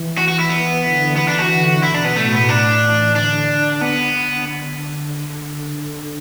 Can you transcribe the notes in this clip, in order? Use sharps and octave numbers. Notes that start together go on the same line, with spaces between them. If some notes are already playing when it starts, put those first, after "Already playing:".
Already playing: E3
F#4
F#4
E4
B3
D3
E3 B3
D4
F#4
D3
B2 E4
D4
B3
A2 A3
B3
D4
E3
D3 D4
B3